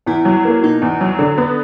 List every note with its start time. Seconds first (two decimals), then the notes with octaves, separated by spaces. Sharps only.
0.06 E2 E4
0.25 F#3
0.45 A#3
0.63 B2 D#4
0.82 E2
1.01 F#3
1.19 D3
1.38 B3